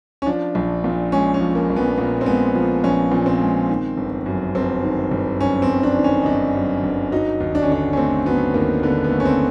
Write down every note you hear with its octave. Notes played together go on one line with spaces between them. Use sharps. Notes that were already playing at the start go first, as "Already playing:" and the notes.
C#4
F3 D4
A#1
A#2
G#3 C#4
C#4
F3
A#3
A#1
B3
A#2 A#3
C4
G#3 B3
F3
A#1 C#4
A#2
C4
G#3
D#3
G1
F#2
G1 C4
D#3
G1
F#2 C#4
C4
G1
D4
D#3
C#4
D#4
G1 D4
F#2
G1
F#3 D#4
D#2
D4
C#4
D3 D4
C#4
A3 C4
F#3 B3
D#2 A#3
D3 B3
B3
A3
C#4
C4